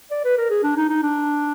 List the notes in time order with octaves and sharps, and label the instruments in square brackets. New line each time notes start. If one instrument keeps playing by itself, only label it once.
[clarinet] D5
B4
A#4
G#4
D4
D#4
D#4
D4